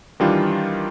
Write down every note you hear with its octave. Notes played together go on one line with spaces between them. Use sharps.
D#3 E3 G3 D4 F4